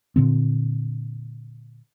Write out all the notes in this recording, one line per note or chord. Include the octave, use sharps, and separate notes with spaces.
A#2 D3 C4